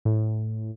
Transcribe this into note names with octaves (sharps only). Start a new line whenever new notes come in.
A2